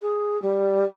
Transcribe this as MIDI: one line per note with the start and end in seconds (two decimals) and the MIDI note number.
0.02 0.40 68
0.42 0.84 55